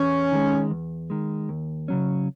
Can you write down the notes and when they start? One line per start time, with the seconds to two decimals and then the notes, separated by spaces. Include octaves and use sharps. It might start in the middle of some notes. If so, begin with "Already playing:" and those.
Already playing: E2 C#4
0.32 D#3 G#3
0.70 E2
1.10 D#3 G#3
1.49 D#2
1.88 C#3 F#3 C#4